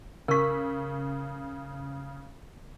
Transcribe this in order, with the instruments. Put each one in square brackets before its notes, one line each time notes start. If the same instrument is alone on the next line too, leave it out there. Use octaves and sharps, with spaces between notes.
[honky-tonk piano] C#3 B6 [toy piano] A#4 C#6